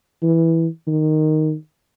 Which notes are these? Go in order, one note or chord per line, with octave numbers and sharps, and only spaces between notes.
E3
D#3